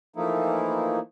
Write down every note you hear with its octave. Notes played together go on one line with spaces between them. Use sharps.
E3 F3 A3 A#3 D#4 E4